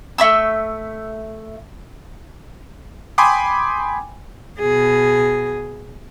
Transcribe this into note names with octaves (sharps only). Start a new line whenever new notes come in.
A3 E5 C#6 E6
G5 G#5 B5 C6 D6 D#6
B2 G#4